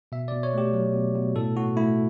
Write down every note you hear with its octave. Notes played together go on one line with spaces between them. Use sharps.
B2 E5
B2 D5
C#5
A3 G4
F#3
B2
B2
A2 A4
A2 F#4
A3 E4